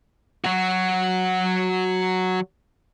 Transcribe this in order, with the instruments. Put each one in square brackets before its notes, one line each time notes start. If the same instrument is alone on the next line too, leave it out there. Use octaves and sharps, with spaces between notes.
[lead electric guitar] F#3 F#4